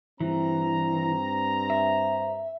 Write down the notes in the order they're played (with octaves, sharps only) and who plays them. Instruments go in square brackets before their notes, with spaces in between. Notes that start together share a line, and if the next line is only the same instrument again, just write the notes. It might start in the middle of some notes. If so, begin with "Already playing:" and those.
[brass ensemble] G2 C4 A#5 [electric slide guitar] E3
[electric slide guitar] E5